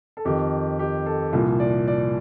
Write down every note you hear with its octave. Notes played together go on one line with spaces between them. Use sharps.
A4
F2 D#3 G4
G4
A4
C2 A#2 F3
D5
D5